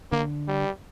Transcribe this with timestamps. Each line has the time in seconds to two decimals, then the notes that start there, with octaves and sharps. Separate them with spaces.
0.12 D3 A#3
0.48 G3